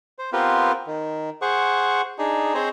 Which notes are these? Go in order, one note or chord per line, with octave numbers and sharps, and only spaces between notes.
C5
B3 C4 F4 G4 A#4 B4
D#3
G#4 C5 F#5 C#6
D4 D#4 G#4
C4 G#4 C5 C#5 D#5